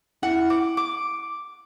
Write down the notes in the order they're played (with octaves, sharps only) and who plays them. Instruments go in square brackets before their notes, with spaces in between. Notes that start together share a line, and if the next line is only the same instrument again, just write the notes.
[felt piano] E4 [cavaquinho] F#5
[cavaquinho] D6
D6